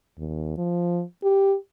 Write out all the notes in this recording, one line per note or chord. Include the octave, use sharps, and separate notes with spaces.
D#2
F3
G4